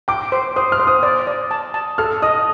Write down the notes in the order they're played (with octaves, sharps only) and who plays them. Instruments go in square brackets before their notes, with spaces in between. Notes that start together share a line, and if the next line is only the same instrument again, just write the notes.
[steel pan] G5 [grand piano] D6
[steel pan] C5
[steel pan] C5 [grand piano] D#6
[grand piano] F6
[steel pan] C5
[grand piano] D#6
[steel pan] D5
D5
A5
A5
[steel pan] A4 [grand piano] F6
[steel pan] D#5 [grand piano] D#6